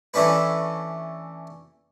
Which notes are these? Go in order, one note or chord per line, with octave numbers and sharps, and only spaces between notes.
E3 A3 C#4 D4 B4